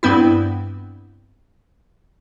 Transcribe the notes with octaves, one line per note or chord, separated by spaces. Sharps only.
G2 B3 C4 E4